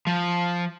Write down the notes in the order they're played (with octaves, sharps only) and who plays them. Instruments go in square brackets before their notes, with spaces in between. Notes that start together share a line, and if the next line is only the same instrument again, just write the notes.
[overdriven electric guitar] F3